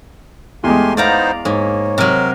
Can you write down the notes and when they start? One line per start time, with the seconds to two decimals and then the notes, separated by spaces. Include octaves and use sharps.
0.64 E2 G#3 A3 G4 G#5 C6
0.97 B3 D#4 C5 D5 F5 A#5
1.45 G#2 A#3 C#5
1.98 C3 F#3 A#4